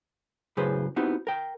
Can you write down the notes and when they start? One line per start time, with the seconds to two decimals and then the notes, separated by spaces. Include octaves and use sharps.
0.57 F#2 A2 C#3 G#4 B4 C5
0.96 B3 C4 D#4 E4 F#4 G4
1.27 A#4 G5